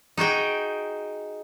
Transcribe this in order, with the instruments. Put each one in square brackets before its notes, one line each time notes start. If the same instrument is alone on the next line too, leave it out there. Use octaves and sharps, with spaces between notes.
[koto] D#4 F#4 G#4 G5